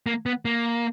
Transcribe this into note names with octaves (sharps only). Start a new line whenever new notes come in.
A#3
B3
A#3